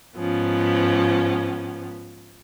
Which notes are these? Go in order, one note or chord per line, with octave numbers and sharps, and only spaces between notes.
G#2 F3 B3 C#4